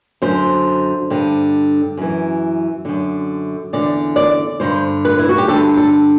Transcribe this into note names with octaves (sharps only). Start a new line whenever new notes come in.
F#2 D3 C5
G2 D3
F#2 E3
F#2 D3
E2 D3 D5
D5
G2 D3 C5
B4
E4
F#4
G4
G2 D3 A4
A4